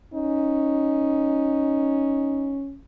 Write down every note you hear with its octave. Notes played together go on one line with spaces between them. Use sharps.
C#4 D#4